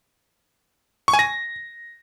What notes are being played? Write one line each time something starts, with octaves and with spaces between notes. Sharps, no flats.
C#6
G#5
A#6